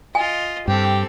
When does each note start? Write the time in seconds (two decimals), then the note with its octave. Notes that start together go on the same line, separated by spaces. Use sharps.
0.15 F4 D#5 G#5
0.68 G2 C4 G4 A4 G5